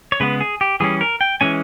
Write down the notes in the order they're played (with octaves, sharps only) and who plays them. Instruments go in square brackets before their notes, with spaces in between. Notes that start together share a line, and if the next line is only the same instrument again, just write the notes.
[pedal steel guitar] C#5
C#3 G#3 B3 B4
G#4
G4
E3 G3 C#4 G#4
A#4
G5
E3 G#3 C#4 G#5